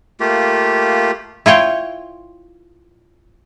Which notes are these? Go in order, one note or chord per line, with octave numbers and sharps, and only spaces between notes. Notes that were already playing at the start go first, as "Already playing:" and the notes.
A3 A#3 F4 G4
E4 F4 C#5 G5